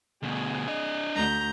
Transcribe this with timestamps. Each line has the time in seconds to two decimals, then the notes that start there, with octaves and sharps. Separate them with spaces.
0.23 D2 B2 G#4
0.68 D4 D#5
1.16 D2 A#5 G6